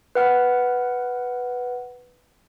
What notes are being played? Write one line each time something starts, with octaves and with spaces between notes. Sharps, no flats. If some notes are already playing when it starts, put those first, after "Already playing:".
B4 F#5 F6